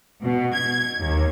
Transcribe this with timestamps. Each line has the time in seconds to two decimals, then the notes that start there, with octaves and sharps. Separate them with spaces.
0.21 B2
0.55 G#6
0.99 D#2